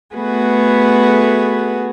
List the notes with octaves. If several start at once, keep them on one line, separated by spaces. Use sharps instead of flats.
A3 B3 F#4 G#4 B4